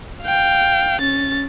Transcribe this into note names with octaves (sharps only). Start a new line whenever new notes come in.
F5 G5
C#4 A6